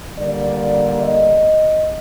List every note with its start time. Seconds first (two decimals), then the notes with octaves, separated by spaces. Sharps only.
0.17 D3 G3 A#3 D5
1.01 D#5